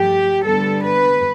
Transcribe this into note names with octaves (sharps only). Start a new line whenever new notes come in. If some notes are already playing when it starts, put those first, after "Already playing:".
Already playing: G2 F3 A3 G4
D3 G3 B3 D4 A4
B4